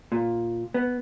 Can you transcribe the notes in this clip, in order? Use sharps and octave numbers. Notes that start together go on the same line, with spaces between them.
A#2
B3